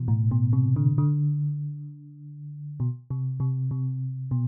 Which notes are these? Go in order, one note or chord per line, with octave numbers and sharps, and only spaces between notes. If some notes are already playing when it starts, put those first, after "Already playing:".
Already playing: B2 E3
A2
B2
C3
D3
D3
B2
C3
C3
C3
B2